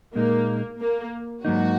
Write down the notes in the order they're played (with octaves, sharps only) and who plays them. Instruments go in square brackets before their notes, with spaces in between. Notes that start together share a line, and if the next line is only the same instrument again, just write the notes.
[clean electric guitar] A#2 G#3 D#4 [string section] A#3
[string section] A#3
[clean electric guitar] G#2 F#3 A#3 D#4 [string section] F#4